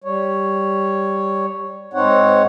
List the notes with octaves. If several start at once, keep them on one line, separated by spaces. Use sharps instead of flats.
G3 C#5
G#2 C4 D#4 C#5 F#5